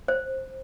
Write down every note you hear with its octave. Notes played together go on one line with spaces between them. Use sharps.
C5